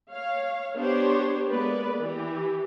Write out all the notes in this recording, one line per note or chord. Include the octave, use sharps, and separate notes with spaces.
C#5 F5
B3 D4 G4 C5 C#5
G#3 A#3 B3 B4 D5
E3 G4